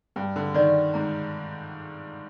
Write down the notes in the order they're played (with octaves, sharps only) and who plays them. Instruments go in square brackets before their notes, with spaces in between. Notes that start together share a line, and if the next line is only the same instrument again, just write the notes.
[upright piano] G2 [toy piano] G5
[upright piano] D3
[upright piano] D#3 [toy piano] D5
[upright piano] G#2 [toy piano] A#5